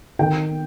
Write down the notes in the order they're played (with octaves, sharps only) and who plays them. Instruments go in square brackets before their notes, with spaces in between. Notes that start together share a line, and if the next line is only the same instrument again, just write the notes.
[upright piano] D#3 G5